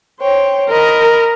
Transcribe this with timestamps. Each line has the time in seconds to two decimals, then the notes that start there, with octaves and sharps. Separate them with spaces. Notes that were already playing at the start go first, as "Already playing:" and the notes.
0.20 C5 C#5 G5
0.70 A#4 D#5 B5